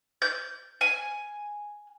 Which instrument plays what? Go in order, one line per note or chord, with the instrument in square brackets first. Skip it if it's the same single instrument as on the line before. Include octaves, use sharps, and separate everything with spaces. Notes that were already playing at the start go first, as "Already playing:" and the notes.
[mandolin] G6
G#5